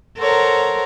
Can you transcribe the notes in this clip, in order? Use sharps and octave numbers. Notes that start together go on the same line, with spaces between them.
A4 A#4 C5 C#5 F#5 A#5